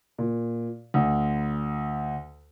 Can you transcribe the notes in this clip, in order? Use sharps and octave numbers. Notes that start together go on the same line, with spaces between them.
A#2
D2